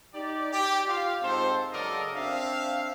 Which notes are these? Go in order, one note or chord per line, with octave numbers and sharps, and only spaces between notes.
D#4 G4 D5
G4
F4 F5
G#2 C4 A4 C5
C#3 F#3 A4 A#4 D5 D#5
C4 D4 E5 F5